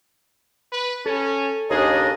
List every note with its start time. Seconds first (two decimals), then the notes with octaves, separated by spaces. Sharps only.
0.72 B4
1.06 C#4 A4
1.70 D#2 C#3 D4 G#4 D#5